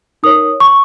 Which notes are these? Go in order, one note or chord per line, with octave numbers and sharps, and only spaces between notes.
D#4 A#4 C#5 D#6
C#6